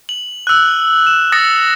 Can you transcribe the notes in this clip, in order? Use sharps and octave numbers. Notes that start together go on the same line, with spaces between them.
F#7
E6 F#6
E7
D#6 A6 A#6 C#7